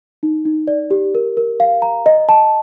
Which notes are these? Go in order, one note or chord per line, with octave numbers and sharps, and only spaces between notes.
D#4
D#4
D5
G4
A#4
A#4
F5
A#5
D#5
A5